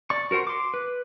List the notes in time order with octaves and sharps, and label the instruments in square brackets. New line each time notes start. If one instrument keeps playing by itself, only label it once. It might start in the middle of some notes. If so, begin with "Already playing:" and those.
[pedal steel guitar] D5 C#6
F#4 A#4 C5 F#5 C6
C6 D6
B4